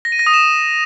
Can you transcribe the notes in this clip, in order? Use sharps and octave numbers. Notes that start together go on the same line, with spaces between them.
A#6
D#7
A#6
D#6
E7